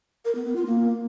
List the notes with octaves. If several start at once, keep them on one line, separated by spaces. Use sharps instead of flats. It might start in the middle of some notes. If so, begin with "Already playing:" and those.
A#4
B3
B3
F4
A#3